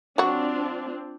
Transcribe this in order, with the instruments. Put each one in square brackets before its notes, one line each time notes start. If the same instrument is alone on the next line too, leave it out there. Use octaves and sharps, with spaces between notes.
[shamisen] F#3 F#4 [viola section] C4 D4 F4